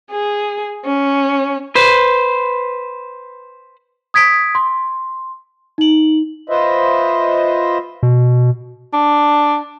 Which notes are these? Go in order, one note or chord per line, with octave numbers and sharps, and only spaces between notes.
G#4
C#4
B4 C5
D#6 G#6 B6 D7
C6
D#4 F#7
F4 B4 C5 D#5 E5
B2
D4